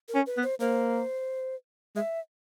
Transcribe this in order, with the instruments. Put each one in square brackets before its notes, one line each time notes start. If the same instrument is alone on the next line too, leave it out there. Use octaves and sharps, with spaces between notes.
[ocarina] A#4
[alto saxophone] C#4
[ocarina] B4
[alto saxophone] B3
[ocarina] C5
[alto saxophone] A#3 [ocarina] C5
[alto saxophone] G#3 [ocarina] E5